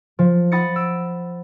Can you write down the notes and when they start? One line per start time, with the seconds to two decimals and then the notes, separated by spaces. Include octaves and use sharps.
0.19 F3
0.52 F#5 B5 D#6 A6 A#6 C#7
0.76 E6 D7